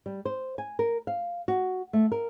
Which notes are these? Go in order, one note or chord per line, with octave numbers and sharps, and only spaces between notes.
G3
C5
G#5
A#4
F5
F#4
A3
A#4